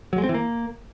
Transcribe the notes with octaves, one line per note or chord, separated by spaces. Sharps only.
F#3
G#3
C4
E3
A#3